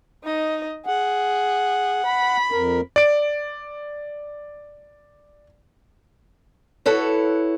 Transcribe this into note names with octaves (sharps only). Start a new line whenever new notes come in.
D#4 D#5
G#4 F#5
B5
F2 A#4
D5 D7
E4 F#4 A4 B4 C#5